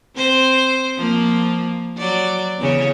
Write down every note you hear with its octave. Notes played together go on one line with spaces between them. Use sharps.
C4 C5
F3 A#3
F#3 D5
E2 C#3 C#5